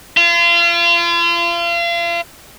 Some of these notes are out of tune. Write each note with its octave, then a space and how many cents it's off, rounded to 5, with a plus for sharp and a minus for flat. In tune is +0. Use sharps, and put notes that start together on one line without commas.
F4 -35